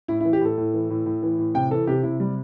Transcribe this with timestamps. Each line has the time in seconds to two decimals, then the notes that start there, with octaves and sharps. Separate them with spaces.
0.08 A2 E4
0.20 E4
0.25 E3
0.33 G4
0.41 A2 A4
0.57 A2
0.74 E3
0.90 A2
1.06 A2
1.23 E3
1.39 A2
1.54 C3 G5
1.71 E3 A4
1.87 C3 G4
2.03 C3 E4
2.20 G3